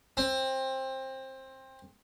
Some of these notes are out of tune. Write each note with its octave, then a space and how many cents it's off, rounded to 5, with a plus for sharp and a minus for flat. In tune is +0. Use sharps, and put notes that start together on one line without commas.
C4 +20